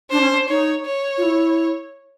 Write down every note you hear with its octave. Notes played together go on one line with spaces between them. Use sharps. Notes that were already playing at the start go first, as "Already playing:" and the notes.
D4 C5
C#4
D4
D#4 C#5
C#5
F4
E4